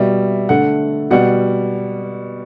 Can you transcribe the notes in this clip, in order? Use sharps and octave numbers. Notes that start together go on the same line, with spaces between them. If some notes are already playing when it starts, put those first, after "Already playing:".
Already playing: B2 G3 E5
D3 A3 F#5
B2 G3 F#5